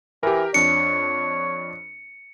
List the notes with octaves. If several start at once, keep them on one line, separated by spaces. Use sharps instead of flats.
E3 G4 A#4
F2 D4 C#5 C#7